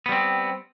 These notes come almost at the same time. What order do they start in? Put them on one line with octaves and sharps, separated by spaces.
B3 G3 C4